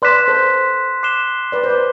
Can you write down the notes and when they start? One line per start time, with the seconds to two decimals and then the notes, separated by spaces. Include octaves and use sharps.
0.02 B4 D5 C6 F#6 B6 E7
0.28 A4 C5
1.03 D6 F#6 C7 E7 G7
1.52 B4 D5
1.64 C5
1.69 B4 D5